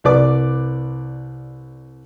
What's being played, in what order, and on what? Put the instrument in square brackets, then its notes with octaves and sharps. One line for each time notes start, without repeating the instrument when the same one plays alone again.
[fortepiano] C2 B4 D5 D6